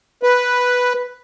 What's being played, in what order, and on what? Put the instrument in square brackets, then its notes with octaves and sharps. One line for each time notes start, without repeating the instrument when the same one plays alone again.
[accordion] B4